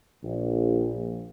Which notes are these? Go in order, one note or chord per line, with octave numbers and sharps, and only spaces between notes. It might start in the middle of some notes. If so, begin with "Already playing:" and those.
A#1